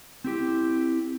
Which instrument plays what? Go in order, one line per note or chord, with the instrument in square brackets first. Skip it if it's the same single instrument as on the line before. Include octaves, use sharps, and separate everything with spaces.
[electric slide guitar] C4 E4 G4